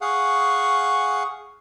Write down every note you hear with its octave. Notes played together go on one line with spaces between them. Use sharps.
G#4 F5 F#5 C#6